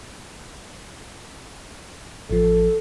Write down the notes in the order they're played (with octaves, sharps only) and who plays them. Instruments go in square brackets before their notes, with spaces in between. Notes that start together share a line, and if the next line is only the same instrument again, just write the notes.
[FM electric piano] A1 F3 [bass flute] A4